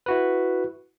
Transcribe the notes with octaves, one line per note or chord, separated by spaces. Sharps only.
E4 F#4 B4